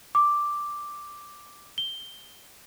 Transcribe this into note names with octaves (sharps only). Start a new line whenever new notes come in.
D6
G7